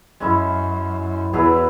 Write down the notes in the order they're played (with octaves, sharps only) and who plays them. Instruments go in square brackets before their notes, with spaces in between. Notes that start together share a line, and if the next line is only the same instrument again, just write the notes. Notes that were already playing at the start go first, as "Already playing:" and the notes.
[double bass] F#2 [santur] G#3 C#4 E4
[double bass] E2 [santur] F#3 E4 G#4 B4